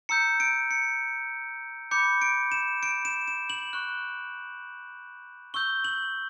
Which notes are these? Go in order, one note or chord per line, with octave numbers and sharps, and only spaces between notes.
A#5 E6 G6 C#7
D7
C#7
B5 D6 G6 C#7
D7
E7
D7
E7
E7
F#7
C#6 F#6
C#6 E6 G6 G7
F#7